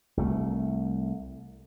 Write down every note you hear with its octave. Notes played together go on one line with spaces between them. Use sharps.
C2 A3